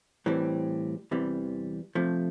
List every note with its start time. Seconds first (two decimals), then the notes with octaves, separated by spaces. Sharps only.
0.26 A2 E3 G3 C4
1.11 E2 C3 E3 G3
1.95 C3 F3 A3